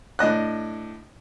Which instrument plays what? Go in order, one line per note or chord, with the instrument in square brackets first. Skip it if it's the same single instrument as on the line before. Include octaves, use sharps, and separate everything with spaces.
[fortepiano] A2 D4 D#5 F#6